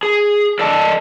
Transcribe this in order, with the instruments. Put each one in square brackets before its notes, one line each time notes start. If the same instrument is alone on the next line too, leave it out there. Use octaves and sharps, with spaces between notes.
[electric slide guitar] G#4
A4 D5 D#5 A5